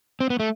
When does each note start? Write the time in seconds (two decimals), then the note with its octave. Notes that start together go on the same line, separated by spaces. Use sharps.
0.20 C4
0.30 B3
0.40 A3